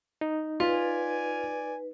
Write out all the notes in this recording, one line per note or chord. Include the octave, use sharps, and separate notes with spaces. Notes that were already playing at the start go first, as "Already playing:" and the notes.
D#4
F4 B4 D5 G#5